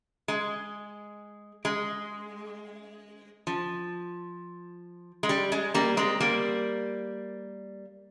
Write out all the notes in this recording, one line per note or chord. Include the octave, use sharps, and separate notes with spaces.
G#3
G#3
F3
G#3
G3
G#3
G3 A#3
G#3 C4
G3 A#3